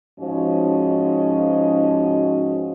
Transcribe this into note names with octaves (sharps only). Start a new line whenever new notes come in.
G#2 F3 C#4 F#4 D#5